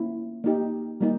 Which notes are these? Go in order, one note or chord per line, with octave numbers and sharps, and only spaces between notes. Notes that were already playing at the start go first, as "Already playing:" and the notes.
Already playing: A#3 C#4 E4
A#3 D#4 G4
G3 A#3 D#4